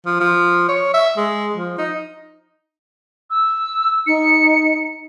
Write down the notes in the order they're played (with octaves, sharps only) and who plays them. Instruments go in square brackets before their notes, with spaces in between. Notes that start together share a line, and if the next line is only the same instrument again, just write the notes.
[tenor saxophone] F3
F3
C#5
E5
G#3
F3
D#4
[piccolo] E6
[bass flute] D#4 [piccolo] C#7